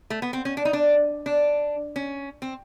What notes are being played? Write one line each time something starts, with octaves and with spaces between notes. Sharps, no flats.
A3
B3
C4
C#4
D4
D#4
D4
D4
C#4
C4